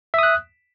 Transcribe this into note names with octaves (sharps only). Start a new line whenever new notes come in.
E5 D#6 F#6